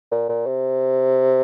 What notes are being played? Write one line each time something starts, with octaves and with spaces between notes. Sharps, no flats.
A#2
A#2
C3